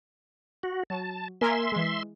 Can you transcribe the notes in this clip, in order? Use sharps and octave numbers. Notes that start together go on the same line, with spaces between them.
F#4
F#3 A5
A#3 A#4 E5 G#5 C6
E3 G#3